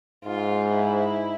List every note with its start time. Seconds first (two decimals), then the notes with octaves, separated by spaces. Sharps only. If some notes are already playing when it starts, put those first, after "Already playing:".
0.24 G#2 F4
0.71 E4